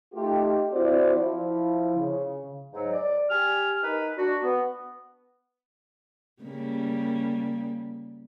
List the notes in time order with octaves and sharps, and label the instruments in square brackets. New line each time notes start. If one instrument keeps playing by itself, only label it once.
[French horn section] A3 D#4 F4 G4
C4 E4 F#4 C5 D5
F3 E4
C#3
[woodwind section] G#2 F#3
D5
G4 G#5 F6
D#4 A#4 B4
D4 F#4
B3
[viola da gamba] C#3 G3 A#3